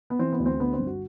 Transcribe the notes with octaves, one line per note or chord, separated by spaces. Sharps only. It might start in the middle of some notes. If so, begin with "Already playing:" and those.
B3
E3 C4
B3
D2
C4
D3 B3
C4
G1
F#4